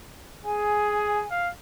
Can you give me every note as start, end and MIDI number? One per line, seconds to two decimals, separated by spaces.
0.45 1.25 68
0.45 1.28 80
1.31 1.51 77